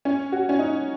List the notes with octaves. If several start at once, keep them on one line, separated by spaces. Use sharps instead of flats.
C#4
F#4
C#4
D#4